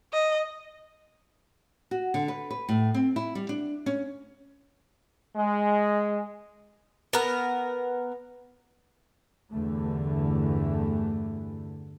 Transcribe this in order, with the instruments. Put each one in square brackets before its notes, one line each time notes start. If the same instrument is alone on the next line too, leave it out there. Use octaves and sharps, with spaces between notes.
[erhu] D#5
[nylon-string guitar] F#4
D3
B4
B4
A2
C4
E4
G3
D4
C#4
[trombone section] G#3
[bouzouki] B3 A#4
[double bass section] E2 G2 D3 E3 A3